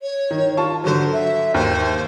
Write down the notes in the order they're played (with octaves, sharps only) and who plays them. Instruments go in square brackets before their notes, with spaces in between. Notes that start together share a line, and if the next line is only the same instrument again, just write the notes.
[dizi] C#5
[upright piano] D#3
F4 A5 C#6
[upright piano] D3 F#3 [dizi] C5
[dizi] E5
[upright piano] D#2 [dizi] C5